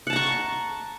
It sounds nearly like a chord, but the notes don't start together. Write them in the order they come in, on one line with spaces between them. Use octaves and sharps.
F#5 A5 A#5 C#6